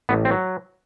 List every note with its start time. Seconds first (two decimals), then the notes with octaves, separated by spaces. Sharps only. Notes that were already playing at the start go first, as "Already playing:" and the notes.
0.09 A1 B3
0.25 C4
0.31 F#3